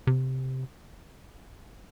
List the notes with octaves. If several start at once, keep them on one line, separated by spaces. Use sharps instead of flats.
C3